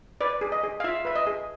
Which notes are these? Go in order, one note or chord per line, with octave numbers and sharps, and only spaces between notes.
B4 D5
G#4
D#5
G#4
F5
F4 E5
B4 E5
D#5
G#4